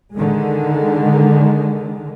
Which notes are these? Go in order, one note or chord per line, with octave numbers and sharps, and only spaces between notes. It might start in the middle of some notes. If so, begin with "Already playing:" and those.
D3 D#3 G#3